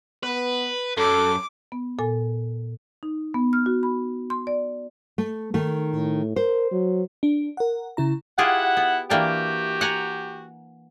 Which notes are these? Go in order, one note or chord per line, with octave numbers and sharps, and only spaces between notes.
B3 B4
F#2 A4 D6
B3
A#2 A4 G#5
D#4
B3
F6
F#4
B5
C6
D5
A3
D#3 A3
A2
A#4 C5
F#3
D4
A#4 F#5
C#3 E4 A#5
E4 F4 G4 G#4 F#5
B3
E3 A#3 D4 F#4 G4
F#5 G#5 A#5